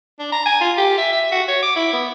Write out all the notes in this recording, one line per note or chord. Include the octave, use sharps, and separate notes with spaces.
D4
A#5
G#5
F4
G4
E5
E5
F#4
C#5
D6
E4
B3